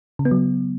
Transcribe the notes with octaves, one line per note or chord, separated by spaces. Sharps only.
C#3
B3
F#3